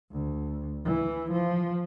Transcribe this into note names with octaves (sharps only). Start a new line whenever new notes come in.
D2
E3
F3